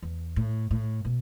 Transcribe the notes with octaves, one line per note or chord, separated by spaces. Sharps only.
E2
A2
A2
B2